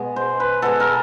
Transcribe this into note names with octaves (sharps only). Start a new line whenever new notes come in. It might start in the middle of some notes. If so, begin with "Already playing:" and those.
Already playing: B2 G#3
C5
B4
B2 G#3 A4
A#4